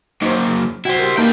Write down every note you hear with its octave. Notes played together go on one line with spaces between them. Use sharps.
F#3 A#3 D#4 C5
E4 F#4 C5 G5
G4 A#4
A#3 D#4 B4 G5 A5